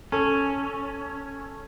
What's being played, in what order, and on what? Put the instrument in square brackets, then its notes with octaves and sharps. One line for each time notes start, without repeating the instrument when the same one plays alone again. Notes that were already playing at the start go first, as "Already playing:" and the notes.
[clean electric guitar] C#4 [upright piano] A4